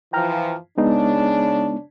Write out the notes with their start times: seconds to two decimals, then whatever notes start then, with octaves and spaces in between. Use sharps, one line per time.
0.13 E3 F3 G5 A#5 F6
0.78 C#3 G#3 B3 D4 D#4